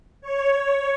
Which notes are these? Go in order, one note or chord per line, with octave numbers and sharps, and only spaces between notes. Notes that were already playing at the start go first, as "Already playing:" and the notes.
C#5